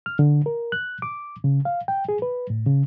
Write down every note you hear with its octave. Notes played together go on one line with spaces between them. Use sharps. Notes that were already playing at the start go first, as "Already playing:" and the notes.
F6
D3
A#4
F#6
D6
C#3
F5
G5
G#4
B4
A2
C#3